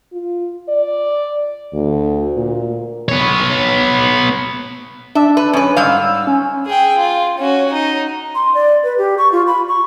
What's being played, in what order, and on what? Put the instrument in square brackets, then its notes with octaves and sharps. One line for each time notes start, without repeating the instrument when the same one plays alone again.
[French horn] F4
D5
D2
A#2
[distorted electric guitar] B3 C#5
[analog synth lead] D4 [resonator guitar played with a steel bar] E5
[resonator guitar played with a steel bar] B4
[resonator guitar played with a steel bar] F#2 B4 [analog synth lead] C#4
[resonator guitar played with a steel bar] G#2 G3 F5 [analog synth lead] E6
[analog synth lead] C#4
[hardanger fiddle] G#4 G5
F4
C#4 F#4
D#4
[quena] C6
D5
B4
G4
C#6
F4
B5
C#6